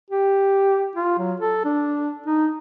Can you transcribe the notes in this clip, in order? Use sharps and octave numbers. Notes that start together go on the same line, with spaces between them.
G4
F4
F#3
A4
D4
D#4